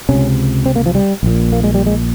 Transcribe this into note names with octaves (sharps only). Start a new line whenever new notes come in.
C#2 C3 C#4
C4
A#3
F3
G3
A#1 A#2
A#3
G#3
G3
G#3